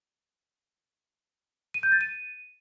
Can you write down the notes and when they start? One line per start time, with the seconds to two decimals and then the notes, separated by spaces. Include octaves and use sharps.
1.74 D#7
1.83 G6
1.92 A6
2.01 D#7